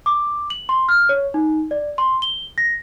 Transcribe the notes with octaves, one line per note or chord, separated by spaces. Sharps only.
D6
F#7
C6
F6
C#5
D#4
D5
C6
G7
A#6